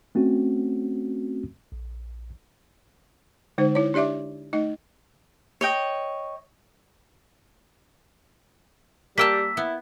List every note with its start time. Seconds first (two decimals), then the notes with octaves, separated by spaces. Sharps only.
0.15 A3 C4 C#4 F#4
1.72 A#1
3.58 D3 G#3 D#4 C5
3.75 E4 C#5
3.94 D4 G4 D5 E5 D6
4.53 A3 D#4 D#5
5.61 C#5 D#5 G5
9.18 G3 A#3 G5 A5 E6 B6
9.57 B3 E4